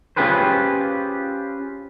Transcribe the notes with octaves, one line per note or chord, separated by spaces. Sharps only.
C#4 F4 G4 G#4 B4 C5